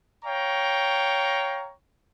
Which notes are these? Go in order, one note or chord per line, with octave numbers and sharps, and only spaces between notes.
C#5 F5 G5 A#5 C#6